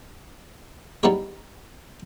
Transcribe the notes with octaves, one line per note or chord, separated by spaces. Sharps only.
G3 B3 D#4 E4 G#4 C#5